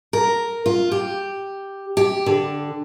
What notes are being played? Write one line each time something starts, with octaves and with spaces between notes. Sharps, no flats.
A#4
F4
G4
G4
D3